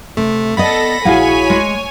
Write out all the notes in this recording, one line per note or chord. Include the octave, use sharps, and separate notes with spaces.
C3 A3
B3 A4 D5 D#5 B5 A#6
A#1 E4 F#4 G#4 C#5 F5 F#5 G#5
G#3